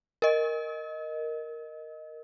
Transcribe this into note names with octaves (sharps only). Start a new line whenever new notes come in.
A#4 D#5